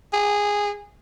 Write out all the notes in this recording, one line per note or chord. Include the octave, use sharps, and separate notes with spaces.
G#4